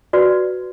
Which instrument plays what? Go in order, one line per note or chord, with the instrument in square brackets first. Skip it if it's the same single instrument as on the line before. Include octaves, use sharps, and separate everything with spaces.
[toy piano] F#4 B4 D5